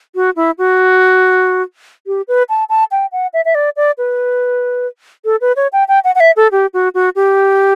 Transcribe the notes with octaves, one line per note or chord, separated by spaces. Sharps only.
F#4
E4
F#4
G4
B4
A5
A5
G5
F#5
E5
E5
D5
D5
B4
A4
B4
C#5
G5
G5
F#5
F#5
E5
A4
G4
F#4
F#4
G4